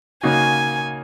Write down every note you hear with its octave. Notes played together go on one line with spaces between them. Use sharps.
C#3 A#3 D#4 F#4 G#5